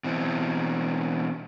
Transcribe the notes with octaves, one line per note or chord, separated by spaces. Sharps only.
B2 E3 C4